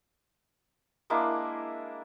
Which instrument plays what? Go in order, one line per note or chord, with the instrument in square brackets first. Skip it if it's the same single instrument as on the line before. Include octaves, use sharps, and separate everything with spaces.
[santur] G#3 A#3 D4 E4